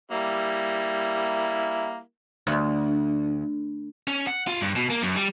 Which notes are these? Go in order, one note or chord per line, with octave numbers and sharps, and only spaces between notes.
G3 A#3 E4
D2
C#4
F#5
F4
G2
B2
A#3
F#2
G3